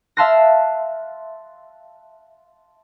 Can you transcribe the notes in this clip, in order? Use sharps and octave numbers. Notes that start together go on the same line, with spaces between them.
E5 F5 A5 C6 F#6 A#6